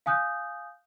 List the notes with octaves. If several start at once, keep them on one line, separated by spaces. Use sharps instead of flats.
F5 G#5 D#6 F#6 G6